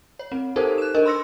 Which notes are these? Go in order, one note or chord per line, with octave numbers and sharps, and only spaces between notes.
C#5
C4
D#4 G4 A4 A#4 C5
F#6 E7
D4 A#4 D#5
B5 C6 E6 A#6 C#7